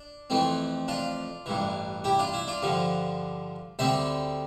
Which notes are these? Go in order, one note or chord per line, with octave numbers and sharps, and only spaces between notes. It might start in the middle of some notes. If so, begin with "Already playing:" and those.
Already playing: D4
F2 E3 A3 C4
D4 F4
A1 G2 E3
E4 G4
D4 F4
E4
D4 F4
G2 D3 F3
D2 D3 G3 C4 C5 E5